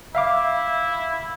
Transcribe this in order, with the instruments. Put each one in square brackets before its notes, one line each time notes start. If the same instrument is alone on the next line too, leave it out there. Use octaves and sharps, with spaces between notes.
[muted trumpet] E4 [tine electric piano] E5 F5 D6